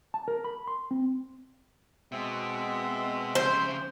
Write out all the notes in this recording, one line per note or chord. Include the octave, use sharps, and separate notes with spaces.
A5
A#4
B5
C6
C4
B2 G#3 C4 E5
F2 C#3 C5